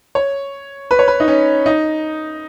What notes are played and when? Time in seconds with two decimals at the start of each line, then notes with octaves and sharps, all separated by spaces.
0.15 C#5
0.91 B4
0.99 C#5
1.08 B4
1.20 D#4
1.28 C#4
1.66 D#4